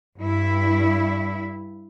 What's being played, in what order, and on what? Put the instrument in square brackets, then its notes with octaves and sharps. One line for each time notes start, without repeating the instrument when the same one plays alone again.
[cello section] G2 E4